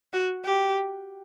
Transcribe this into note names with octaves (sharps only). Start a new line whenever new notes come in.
F#4
G4